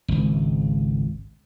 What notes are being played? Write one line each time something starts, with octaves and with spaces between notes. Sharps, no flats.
G#1 C#2